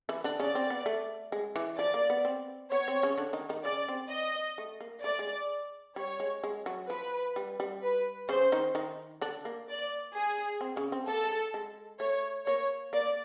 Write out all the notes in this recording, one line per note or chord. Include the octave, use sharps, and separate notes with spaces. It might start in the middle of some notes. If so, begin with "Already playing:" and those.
E3 E4
D3 D4
C#3 C#4 D5
C4
B3
A3
G#3
E3
F3 D5
A#3
B3
C4
B3 C#5
C4
C#3 C#4
D3 D4
D#3 D#4
D#3 D#4
C#3 C#4 D5
C4
D#5
A3
A#3
A3 D5
G#3
G3 C#5
G#3
G#3
F#3
F3 B4
G3
G3
B4
C#3 C#4 C5
D#3 D#4
D#3 D#4
D3 D4
A#3
D5
G#4
C4
C#3 C#4
C4
A#3 A4
G#3
G#3
A3 C#5
A#3 C#5
A#3 D5